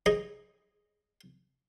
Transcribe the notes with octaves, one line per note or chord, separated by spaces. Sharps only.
D#4 G#4 D#5